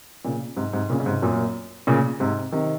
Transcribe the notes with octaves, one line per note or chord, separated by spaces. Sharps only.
A#2 C#3
G#2 C3
G#2 C3
A#2 C#3
C#3
G#2 C3
F#2 A#2
A#2 C#3
G#2 C3
C3 D#3